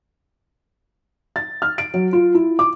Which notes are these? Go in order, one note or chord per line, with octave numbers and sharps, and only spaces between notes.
A6
F6
D7
F#3
F4
E4
D6